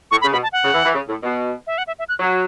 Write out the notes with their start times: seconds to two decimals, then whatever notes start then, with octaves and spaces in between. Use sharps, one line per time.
0.11 A2 C#6
0.21 C#3 B5
0.32 B2 B5
0.43 A5
0.53 F#5
0.63 C#3
0.74 E3
0.84 E3
0.95 C#3
1.08 A2
1.23 B2
1.67 E5
1.78 F#5
1.87 E5
1.99 E5
2.09 F#6
2.19 F#3